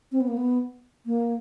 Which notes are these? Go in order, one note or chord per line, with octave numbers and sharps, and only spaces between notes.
C4
B3
A#3
B3
A#3